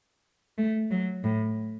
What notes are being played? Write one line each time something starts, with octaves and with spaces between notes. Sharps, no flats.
A3
F#3
A2